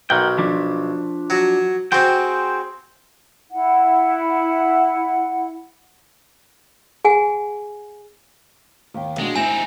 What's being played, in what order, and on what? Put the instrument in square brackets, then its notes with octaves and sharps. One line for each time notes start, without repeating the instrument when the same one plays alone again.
[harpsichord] B1 [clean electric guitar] A#4 F#5 G5
[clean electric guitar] F3 D4
[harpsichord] F#3 F#4
[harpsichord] C4 F#4 [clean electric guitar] G#4 C5 G5
[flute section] E4 F#5
[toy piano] G#4 F#5 G#5
[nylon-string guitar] D#2 G5
[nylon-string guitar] B2 D4 F#4 [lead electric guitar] G#3
[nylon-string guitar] D2 E4 [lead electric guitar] C4 D#4 [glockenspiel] G#5